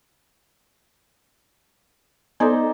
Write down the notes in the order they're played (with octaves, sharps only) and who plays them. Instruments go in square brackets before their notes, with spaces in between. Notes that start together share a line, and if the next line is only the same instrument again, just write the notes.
[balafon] B3 A4 [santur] D#4 C5 D5